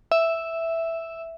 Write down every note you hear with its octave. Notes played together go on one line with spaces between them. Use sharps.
E5